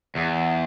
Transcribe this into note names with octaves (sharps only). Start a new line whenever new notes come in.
E2